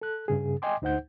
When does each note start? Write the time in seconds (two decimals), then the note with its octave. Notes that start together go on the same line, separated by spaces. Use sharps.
0.01 A4 F#6
0.28 G2 C#3 G#4
0.62 D#5 G5 G#5 C6 D6
0.82 D2 D#4 C5 F#5 G6